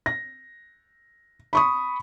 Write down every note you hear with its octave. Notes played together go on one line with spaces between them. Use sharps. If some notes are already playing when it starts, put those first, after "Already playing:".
A#6
B5 C#6 D#6